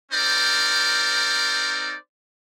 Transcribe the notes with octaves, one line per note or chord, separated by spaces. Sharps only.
C4 D#4 A#4 C5 D5